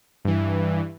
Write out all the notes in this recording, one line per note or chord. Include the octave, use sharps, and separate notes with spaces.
G2 E3